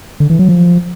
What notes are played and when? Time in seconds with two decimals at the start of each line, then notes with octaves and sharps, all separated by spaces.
0.20 D3
0.30 E3
0.39 F#3
0.49 F3